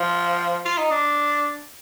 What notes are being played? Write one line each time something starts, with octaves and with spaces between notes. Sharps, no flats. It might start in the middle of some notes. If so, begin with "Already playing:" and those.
Already playing: F3
F4
D#4
D4